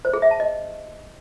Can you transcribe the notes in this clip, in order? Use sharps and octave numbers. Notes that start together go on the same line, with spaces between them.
C5
G#4
E5
A5
D#5